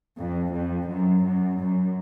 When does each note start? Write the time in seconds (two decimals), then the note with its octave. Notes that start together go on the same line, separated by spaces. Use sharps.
0.19 F2
0.53 F2
0.89 F#2
1.23 F#2
1.58 F#2